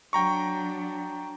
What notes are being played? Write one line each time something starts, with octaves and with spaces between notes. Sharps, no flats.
F#3 D4 G5 A#5 C#6